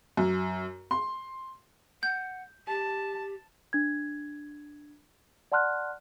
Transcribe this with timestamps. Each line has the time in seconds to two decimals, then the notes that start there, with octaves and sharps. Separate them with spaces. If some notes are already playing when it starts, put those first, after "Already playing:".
0.17 F#2
0.91 C6
2.03 F#5 G6
2.68 G4 A5
3.73 D4 G#6
5.52 D5 F#5 A5 C6 F6 F#6